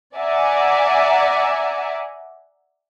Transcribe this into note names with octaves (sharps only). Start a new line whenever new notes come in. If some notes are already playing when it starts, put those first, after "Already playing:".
D5 E5 F#5 G#5 A#5